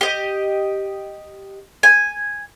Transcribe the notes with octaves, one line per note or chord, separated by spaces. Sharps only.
G4 D#5
G#5